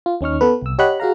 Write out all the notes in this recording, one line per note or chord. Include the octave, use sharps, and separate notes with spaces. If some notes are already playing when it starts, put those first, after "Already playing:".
F4
D#2 C#4 D#4 C#6 F6
B3 A4 B4
C2 E6
G4 C#5 D#5 F#5 B5 F#6
F#4 G#4 F5 A#5